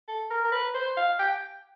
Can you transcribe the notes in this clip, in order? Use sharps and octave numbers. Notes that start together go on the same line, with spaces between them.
A4
A#4
A#4
B4
C5
F5
G5